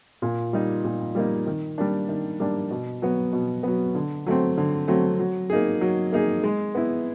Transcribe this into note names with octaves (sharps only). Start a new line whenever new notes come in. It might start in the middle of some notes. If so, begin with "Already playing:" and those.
A#2
G3 A#3 D#4
A#2
G3 A#3 D#4
D#3
G3 A#3 D4
D#3
G3 A#3 D4
B2
F#3 B3
B2
F#3 B3
D3
F#3 A3 C4
D3
F#3 A3 C4
F#3
A#3 D#4 G#4
F#3
A#3 D#4 G#4
G#3
B3 E4